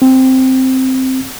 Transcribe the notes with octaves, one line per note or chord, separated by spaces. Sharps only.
C4